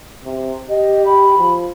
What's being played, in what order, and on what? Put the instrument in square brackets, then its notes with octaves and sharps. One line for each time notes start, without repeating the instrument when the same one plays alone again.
[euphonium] C3
[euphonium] G4 [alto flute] D#5
[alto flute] B5
[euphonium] F3